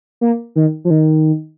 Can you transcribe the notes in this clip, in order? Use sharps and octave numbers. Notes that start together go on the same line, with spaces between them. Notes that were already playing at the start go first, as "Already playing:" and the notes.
A#3
D#3
F3
D#3